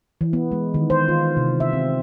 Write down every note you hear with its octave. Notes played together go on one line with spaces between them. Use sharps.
E3
B3
G#3
D#3
C5
F4
C3
E5
C4